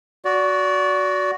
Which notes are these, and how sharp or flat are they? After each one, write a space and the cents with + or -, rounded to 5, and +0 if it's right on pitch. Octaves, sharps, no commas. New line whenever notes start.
F#4 +0 D5 -25